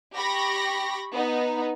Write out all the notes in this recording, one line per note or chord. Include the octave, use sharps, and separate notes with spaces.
G4 B5 C#6 A#6
B3 D#4